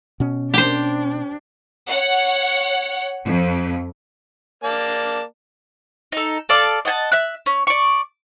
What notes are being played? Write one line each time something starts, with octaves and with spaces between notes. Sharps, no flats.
B2 C#4
D4 G4 C5
C#5 F#5
F2
A#3 D5 A5
D#4 A4
A4 D5 F5
D#5 F#5 G#5 A5
E5 F#6
C#4
D5 C#6